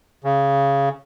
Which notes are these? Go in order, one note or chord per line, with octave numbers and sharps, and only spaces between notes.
C#3